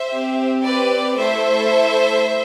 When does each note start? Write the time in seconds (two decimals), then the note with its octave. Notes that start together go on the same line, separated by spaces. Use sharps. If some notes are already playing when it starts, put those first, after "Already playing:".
Already playing: C5 E5
0.12 C4 G4
0.64 B4 D5
1.17 A3 E4 A4 C5 E5